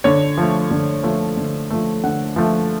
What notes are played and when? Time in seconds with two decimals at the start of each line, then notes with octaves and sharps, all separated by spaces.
0.04 D3 C#5
0.38 F3 A3
0.71 D3
1.03 F3 A3
1.37 D3
1.70 F3 A3
2.04 D3 F#5
2.36 F3 A3